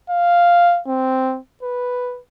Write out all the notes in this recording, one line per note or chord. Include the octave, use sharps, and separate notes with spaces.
F5
C4
B4